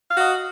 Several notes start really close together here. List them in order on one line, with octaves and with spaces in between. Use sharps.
F5 F#4 D#5